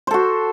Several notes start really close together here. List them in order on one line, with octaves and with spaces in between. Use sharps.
C5 A4 F#4